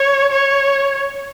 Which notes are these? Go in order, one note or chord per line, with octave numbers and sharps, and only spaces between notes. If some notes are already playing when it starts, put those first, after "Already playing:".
Already playing: C#5
C#5